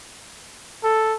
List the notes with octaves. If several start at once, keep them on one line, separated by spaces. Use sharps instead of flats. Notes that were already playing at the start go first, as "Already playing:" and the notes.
A4